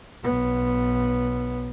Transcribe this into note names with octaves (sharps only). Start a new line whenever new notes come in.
B1 B3